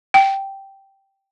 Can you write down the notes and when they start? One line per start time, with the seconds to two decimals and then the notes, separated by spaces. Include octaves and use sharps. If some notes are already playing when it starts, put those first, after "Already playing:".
0.14 G5